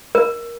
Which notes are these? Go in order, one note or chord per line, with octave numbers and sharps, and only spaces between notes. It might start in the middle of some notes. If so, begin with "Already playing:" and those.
A#4